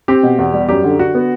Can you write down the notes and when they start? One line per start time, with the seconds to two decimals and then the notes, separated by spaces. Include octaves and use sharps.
0.08 C4 G4
0.23 B2
0.38 E2
0.53 G3
0.69 F#2 G4
0.84 D3
0.98 D3 F#4
1.15 B3